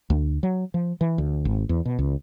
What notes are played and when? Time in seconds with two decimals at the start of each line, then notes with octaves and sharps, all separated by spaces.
0.10 D2
0.43 F#3
0.74 F3
1.01 E3
1.18 D2
1.45 G#1
1.69 E2
1.85 B2
1.99 C#2